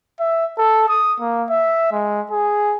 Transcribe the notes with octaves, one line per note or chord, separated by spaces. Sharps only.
E5
A4
D#6
A#3
E5
G#3
G#4